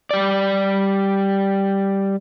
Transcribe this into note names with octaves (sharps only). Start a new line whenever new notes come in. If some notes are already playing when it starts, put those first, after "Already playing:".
G3 D5